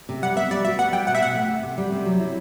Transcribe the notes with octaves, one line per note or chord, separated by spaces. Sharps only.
C3
G3 F#5
B3 E5
G3 D5
F#4 E5
B3 F#5
G3 G5
B2 F#5
E5
B2 F#5
A3
C3
C3
G3
C3
F#3
E4